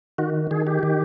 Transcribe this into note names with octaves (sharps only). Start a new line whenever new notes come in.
D#3 F#4
D#3 G#4
G4
D#3